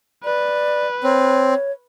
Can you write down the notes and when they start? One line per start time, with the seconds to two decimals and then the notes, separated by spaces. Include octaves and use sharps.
0.24 B4 D5
1.03 C4 C#5